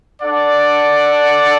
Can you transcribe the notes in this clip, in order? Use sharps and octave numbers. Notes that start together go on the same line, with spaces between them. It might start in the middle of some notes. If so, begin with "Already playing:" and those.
D4 A4 D5 F#5